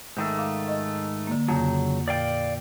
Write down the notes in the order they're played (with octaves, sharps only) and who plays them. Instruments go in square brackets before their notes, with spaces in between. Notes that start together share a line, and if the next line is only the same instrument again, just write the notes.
[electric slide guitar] G#2 D#3 A3 [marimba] G6
[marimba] F5 D6
D#5
D3 A#3
[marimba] F2 [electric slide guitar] C#3 F#3
[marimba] A#2 [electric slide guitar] D5 F5 G5